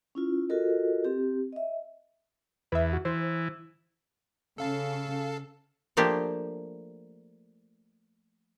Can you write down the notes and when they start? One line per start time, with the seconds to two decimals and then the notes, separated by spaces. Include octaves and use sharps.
0.15 C#4 E4 F4
0.49 F4 F#4 A4 A#4 D#5
1.05 C4 G4
1.53 D#5 E5
2.72 E2 B4 E5
2.93 F#4
3.05 E3 C5
4.58 C#3 A4 F5 A5
5.97 F3 A3 A#3 D4 G4